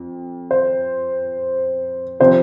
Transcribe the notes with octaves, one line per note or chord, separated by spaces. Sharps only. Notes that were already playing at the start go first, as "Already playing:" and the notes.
Already playing: F2
C5
C3 F3 C5